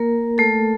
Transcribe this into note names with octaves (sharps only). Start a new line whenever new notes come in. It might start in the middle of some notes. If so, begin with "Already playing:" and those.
Already playing: A#3 A#4
A3 A4